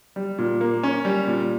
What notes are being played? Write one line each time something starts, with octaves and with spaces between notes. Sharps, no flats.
G3
A#2
A#3
C#4
G3
A#2